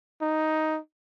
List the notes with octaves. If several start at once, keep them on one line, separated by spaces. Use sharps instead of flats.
D#4